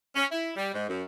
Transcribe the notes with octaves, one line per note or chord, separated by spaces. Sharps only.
C#4
E4
G3
G#2
F#2